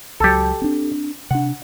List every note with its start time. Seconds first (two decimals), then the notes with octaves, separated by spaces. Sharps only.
0.20 C#2 F#3 G4 A4
0.62 C4 D4
1.31 C3 D4 F#5